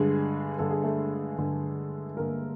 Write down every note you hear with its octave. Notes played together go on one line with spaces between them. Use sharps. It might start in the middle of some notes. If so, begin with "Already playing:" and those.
Already playing: G2 D3 G#3 G#4
G2 D3 A4
G#4
A3 A4
G2 D3
G2 D3 A#3 A#4